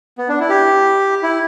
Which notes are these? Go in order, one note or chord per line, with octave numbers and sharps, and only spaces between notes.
B3
D4
E4
G4
E4